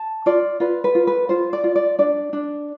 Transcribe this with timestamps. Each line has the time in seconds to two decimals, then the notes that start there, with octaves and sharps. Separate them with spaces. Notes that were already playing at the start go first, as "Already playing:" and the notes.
Already playing: A5
0.26 F4 D5
0.60 F4 B4
0.84 B4
0.95 F4
1.07 B4
1.29 F4 C5
1.53 D5
1.64 F4
1.76 D5
1.99 D4 D5
2.33 D4